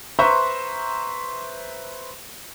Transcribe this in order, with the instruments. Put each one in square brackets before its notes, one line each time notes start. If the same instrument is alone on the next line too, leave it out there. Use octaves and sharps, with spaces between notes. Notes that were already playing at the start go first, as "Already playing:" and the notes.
[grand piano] B4 C5 E5 A#5 C6 C#6